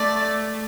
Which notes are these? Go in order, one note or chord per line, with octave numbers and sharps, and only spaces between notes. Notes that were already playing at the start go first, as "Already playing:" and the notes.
Already playing: A3 D5